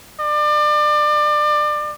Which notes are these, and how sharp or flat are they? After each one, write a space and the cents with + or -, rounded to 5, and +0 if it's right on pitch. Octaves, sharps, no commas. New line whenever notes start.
D5 +30